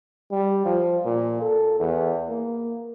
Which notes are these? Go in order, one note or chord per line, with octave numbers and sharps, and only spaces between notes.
G3
F3
A#2
A4
E2
A#3